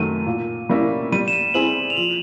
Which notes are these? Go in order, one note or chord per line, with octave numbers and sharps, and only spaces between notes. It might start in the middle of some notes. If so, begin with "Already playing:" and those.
Already playing: F#2 D#3 F#3 A3 D#7
A#2
G3 A#3 C#4 E4
G3 D#7
E7
D#7
C4 E4 G#4 F#7
F7
F3 F#7